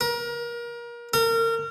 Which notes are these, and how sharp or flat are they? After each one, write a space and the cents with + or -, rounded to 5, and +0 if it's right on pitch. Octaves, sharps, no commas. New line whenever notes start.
A#4 +30
A#4 -30